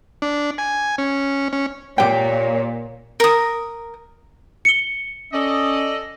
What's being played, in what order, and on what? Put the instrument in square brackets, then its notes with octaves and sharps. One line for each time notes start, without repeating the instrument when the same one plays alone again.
[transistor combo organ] D4
G#5
C#4
C#4
[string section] A#2 [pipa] G4 G5 [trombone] C#5
[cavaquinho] A#4 D#6
[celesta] C#7 G7
[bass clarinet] C#4 [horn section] A4 D5 D#5